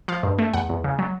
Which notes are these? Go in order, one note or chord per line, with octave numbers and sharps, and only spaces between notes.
F3 F5
G2
A3
E2 F#5
E2
C#3
F#3